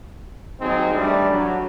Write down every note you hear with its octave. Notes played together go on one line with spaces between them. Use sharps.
D#2 F#3 C4 D#4 G#4
E3 G3 A3 D4
F#3